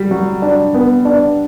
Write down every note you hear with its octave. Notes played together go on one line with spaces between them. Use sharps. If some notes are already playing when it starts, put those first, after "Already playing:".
Already playing: G3 F#4
F#3
D4
B3
D4